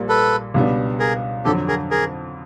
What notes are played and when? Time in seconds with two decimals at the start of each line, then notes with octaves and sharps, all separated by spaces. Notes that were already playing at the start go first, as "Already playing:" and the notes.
Already playing: A#1 A#2 G3 A#3
0.09 A4 B4
0.54 C#2 B2 G3 B3 D4
0.99 G#4 A#4
1.45 F2 D3 F#3 G4 A4
1.68 G#4 A#4
1.91 G#4 A#4